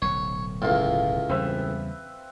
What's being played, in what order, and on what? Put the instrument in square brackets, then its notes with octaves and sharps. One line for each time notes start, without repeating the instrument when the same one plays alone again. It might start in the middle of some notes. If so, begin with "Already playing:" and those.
[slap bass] D1 B1 [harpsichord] C#5
[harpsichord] C#2 A2 [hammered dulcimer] F4
[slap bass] E2 C#3 G3 [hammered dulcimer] C4 B4 E5